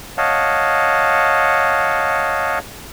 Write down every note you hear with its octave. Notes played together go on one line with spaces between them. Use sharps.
C#5 D#5 F5 F#5 A5